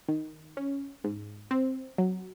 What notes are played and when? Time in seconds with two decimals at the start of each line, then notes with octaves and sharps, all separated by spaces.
0.08 D#3
0.57 C#4
1.04 G#2
1.51 C4
1.98 F#3